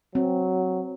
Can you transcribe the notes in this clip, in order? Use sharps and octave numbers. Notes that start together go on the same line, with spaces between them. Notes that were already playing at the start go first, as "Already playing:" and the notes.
F#3 C4